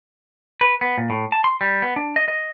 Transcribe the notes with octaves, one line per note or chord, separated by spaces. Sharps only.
B4
B3
A#2
A2
A5
C6
G3
B3
D4
D#5
D#5